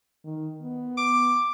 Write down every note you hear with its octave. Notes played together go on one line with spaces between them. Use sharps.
D#3
B3
D6